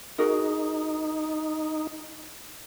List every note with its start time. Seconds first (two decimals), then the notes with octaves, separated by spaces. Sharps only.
0.18 D#4 F#4 G#4 A#4